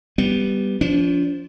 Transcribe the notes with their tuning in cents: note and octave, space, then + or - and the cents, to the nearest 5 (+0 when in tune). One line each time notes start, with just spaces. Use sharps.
G3 +0 B3 +5
F3 +0 D4 -40